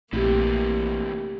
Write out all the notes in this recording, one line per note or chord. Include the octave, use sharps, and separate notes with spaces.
A#1 C3 E3 A3 A#3 G4